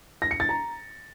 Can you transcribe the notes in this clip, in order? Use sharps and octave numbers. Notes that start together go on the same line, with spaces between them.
A#6
C#7
A6
A#5